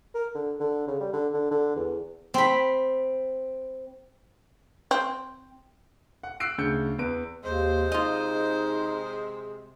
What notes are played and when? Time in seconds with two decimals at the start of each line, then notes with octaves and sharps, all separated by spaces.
0.14 A#4
0.35 D3
0.60 D3
0.88 C#3
1.00 G3
1.13 D3
1.34 D3
1.51 D3
1.76 E2
2.34 C4 B5
4.91 C4
6.23 F#5
6.40 E6 F#6 C7 D7
6.58 D2 C#3 G6 C#7
6.98 E2 B4 D7
7.43 D#2 C3 G#3 C5
7.92 D#4 F4 D#5